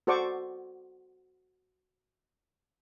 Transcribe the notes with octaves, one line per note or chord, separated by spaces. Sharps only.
F#4 A4 C5 D5 C#6 D6